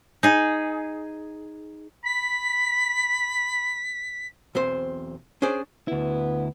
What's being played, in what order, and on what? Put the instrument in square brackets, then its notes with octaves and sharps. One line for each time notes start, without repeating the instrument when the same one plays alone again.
[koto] D#4 G#4
[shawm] B5 [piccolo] B6
[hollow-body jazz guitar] B1 E2 C4 C5
C#4 D4 G#4 C5 D5
[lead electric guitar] D2 E4 [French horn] B3